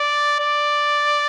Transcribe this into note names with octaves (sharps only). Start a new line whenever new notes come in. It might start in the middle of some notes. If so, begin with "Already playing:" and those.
Already playing: D5
D5